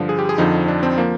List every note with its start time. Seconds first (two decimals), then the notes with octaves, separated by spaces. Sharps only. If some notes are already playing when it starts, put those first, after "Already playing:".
Already playing: G2 D3 F3
0.09 G#4
0.19 G4
0.29 G#4
0.38 F2 D3 F3 D#4
0.68 D4
0.83 C4
0.98 F3 A#3